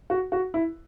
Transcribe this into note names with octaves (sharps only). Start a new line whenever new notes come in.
F#4
F#4
E4